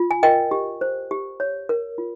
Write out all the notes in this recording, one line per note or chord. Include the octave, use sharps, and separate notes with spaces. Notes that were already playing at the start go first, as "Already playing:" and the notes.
Already playing: F4
G#5
A#4 D#5 G5
G4
C5
G4
C#5
A#4
F4